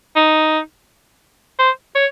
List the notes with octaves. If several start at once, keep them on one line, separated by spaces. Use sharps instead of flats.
D#4
C5
C#5